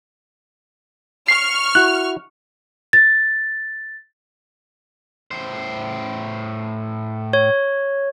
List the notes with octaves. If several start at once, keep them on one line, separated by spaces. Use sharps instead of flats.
C#6 F6 C7
E4 F#4 F#6
A6
A2 C5
C#5